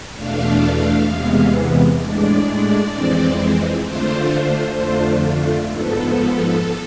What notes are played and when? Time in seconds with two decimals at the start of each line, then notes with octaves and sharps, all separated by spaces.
0.16 E2 B2 A3 D4 F5
1.08 E2 C3 E3 G#3 B3
1.99 A2 G#3 D4 D5
2.91 F2 E3 G#3 C4
3.84 D3 A3 D4 F4 C5
4.76 F2 D3 A3 D4 F4
5.67 G#2 F3 B3 A4